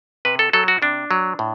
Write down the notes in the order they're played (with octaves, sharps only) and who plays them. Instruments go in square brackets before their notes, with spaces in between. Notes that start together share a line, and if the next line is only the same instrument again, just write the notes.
[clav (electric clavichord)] C3 B4
A4
F#3 A4
F#4
C3 D4
F#3
A2